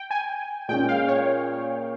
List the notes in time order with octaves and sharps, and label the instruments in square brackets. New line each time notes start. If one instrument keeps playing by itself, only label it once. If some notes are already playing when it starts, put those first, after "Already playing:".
Already playing: [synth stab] G5
G#5
[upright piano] A#2 G#3 C#4 [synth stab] G5
[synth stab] F5
C#5